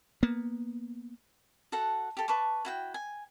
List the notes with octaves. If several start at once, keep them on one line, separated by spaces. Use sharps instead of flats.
A#3 B3
F#4 A4 F#5
G4 A4
B4 A5 C#6 D6
E4 F#4 G5
G#5